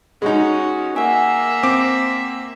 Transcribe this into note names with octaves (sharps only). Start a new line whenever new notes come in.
G#3 C#4 D#4 F#4
A#3 E5 F#5 G#5
C4 D6